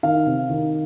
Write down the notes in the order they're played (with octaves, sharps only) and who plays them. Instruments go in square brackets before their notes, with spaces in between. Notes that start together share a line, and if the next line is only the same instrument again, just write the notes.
[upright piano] D#3 F5
C3
D#3